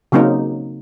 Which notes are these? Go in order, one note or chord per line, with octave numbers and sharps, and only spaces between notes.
C#3 F#3 A#3 C4 D#4